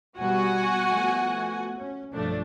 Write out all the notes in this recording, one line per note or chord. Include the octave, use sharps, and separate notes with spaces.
B2 G3 B3 F#4 F#5 G#5
F3 A3 B3
C#4
B1 G2 F3 A3 D4